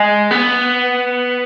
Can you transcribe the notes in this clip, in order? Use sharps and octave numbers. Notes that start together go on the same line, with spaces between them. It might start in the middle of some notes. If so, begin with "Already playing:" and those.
Already playing: G#3
B3